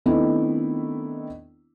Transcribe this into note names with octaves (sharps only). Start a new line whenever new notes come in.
D#3 A3 B3 C4 D4 E4